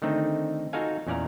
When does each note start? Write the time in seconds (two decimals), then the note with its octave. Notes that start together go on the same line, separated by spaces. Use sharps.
0.02 D3 D#3 A3 C4 D#4
0.73 D#4 F4 F#4 A4 F5 G#5
1.07 E2 A#2 C#4 D5 F5 A#5